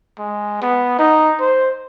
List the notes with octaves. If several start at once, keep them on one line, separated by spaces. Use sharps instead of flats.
G#3
B3
D#4
C5